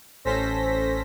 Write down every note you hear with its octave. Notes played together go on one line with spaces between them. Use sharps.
A1 C#4 A4 C5 A#6 B6